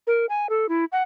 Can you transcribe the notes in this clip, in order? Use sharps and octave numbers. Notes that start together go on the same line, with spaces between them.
A#4
G#5
A4
E4
F#5